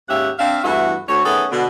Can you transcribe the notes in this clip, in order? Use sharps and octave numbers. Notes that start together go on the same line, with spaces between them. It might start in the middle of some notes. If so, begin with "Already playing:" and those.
D#2 G#2 C#4 G4 E5 F#5
C4 D4 E5 F5
E2 G2 E3 A3 F#4 E5
D2 C#5
D#3 A3 B3 C#4 G#4 A4
B2 D3